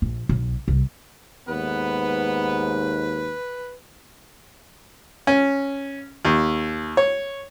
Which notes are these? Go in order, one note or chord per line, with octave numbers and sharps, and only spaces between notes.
A#1
B1
C2
D#2 G#2 B3 B4
C#4
D#2
C#5